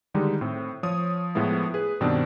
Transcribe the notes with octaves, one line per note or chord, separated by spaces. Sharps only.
D3 D#3 G3 G#3 D#4
A2 C4
F3 C#5 D#6
A2 F3 G#3 B3 E4
G#4 B4
G2 B2 D#3 C4 D4